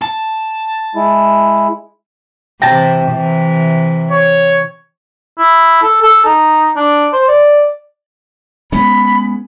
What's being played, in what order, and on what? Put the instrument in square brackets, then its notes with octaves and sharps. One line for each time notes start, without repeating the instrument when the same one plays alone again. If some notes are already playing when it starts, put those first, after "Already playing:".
[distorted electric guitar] A5
[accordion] G#3 E4
[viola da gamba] C3 E3 [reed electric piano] G5 [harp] A5 A#6
[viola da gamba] C3 E3
[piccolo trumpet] C#5
[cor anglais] E4
A4
A4
D#4
D4
C5
D5
[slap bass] G#3 B3 C#4 [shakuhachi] B5